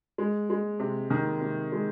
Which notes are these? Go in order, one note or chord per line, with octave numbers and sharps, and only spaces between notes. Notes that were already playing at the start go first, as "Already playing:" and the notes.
G#3
G#3
C3
D#3
C3
G#3